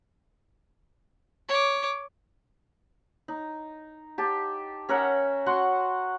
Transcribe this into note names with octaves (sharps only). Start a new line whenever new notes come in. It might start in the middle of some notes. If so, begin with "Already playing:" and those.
C#5 D6
D#4
G4 A5
C#4 A#4 E5 F#5
F#4 F#5 C6 C#6